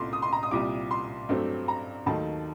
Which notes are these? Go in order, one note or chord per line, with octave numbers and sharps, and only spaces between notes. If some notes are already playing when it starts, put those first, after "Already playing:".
Already playing: C2 A#2 A3 C6 D6
D#6
C6
A#5
D#6
C2 A#2 G3 D6
C6
G2 F#3 A3 C4
A#5
D#2 D#3 F#3 A3 D#4 A5